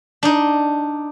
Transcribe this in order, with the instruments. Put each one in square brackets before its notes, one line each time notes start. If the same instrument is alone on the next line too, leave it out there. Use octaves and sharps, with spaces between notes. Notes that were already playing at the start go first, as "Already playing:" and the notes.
[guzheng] D4 D#4